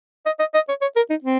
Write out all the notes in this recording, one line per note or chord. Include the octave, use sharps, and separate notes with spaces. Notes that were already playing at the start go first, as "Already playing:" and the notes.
D#5
D#5
D#5
C#5
C#5
A#4
D#4
C4